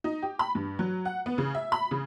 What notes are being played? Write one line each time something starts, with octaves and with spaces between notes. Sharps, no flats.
D#4
G4
B5
G2
F#3
F#5
B3
C#3
E5
B5
C#3